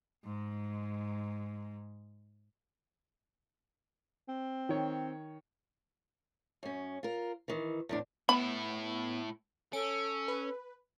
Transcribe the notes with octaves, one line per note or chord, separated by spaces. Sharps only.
G#2 G#3
C4
D#3 C#5
F#2 C#4
F4 A#4
D#3 E3
E2 A2 D4
A2 B3 E4 B5
C#4 A4 D7
B4